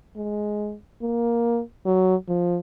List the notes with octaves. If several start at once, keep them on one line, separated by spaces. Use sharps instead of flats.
G#3
A#3
F#3
F3